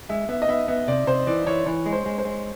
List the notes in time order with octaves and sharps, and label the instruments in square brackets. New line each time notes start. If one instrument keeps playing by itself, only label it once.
[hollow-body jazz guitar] G#3 [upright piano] E5
[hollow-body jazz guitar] B3 [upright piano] E5
[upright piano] D#5
[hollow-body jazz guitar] B3 [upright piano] E5
[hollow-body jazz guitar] B3 [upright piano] E5
[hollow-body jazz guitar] C3 [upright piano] D5
[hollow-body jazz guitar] C3 [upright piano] C5
[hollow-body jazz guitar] E3 [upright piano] D5
[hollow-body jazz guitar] E3 [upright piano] C#5
[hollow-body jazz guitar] E3 [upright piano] C#5
[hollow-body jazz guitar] G#3
[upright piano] C5
[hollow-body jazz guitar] G#3
[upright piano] C5
[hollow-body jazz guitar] G#3